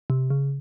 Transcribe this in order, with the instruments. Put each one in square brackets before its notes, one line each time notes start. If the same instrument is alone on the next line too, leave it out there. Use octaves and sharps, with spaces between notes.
[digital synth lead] C3
C#3